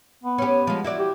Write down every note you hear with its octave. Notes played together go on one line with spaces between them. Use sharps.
B3
C#4 G4
F3 G#3
E4 F#4 D5
G4